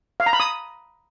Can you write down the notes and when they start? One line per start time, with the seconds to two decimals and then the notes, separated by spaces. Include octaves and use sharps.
0.20 F5
0.26 A#5
0.33 B5
0.40 D#6